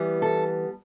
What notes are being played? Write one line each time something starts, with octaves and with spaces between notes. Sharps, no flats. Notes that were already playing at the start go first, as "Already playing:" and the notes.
Already playing: E3 G3 B3
A4